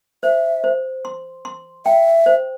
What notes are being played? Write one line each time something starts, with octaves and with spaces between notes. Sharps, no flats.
C5 E5
C5
C6
C6
E5 G5
C5